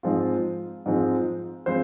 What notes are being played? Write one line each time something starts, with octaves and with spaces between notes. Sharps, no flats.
G#2 F3 G#3 C4 F4
G#2 F3 G#3 C4 F4
F3 G#3 C4 F4 C5